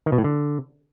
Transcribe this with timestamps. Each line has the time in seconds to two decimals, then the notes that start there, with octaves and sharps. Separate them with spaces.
0.06 D#3
0.12 B2
0.18 A2
0.24 D3